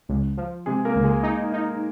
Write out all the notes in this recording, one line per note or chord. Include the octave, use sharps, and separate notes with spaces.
C#2
F3
C3 G#3 G#4
A#3 A#4
C#2
G#3 G#4
D#4
D#4